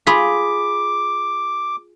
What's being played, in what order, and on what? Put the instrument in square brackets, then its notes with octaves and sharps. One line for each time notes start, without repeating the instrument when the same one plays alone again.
[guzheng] F4 G#4 [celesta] B5 B6 [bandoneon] D6